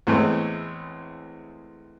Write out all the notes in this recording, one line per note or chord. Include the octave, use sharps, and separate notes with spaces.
E2 A2 G#3 A3 C4